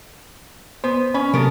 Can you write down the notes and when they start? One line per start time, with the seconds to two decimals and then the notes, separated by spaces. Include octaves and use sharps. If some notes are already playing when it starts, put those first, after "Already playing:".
0.84 B3 C5
1.14 C#4 B5
1.33 C3 F#3 A#3 B3 A4 A#4